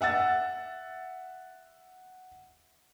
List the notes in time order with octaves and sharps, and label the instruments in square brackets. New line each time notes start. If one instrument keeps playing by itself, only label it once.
[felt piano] E5 F#5 E6 A6